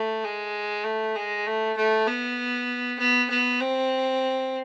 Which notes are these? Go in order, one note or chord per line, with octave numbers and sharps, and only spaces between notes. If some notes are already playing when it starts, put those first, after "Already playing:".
Already playing: A3
G#3
A3
G#3
A3
A3
B3
B3
B3
C4